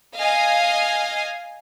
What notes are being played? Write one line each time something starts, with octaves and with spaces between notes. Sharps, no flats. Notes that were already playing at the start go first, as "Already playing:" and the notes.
D#5 F5 G#5